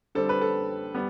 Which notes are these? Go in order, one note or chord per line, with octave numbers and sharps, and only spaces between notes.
D3 G3 C4 A4
B4
A4
G3 B3